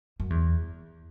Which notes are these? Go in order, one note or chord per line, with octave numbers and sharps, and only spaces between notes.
F#2
E2